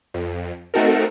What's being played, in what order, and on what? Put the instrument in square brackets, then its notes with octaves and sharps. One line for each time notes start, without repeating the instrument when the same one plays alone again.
[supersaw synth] F2
A3 C4 D#4 F#4 A4 A#4